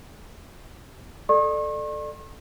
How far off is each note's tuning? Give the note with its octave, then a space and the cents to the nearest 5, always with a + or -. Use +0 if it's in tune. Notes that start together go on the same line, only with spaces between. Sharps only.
A4 +0 D5 +30 C#6 -45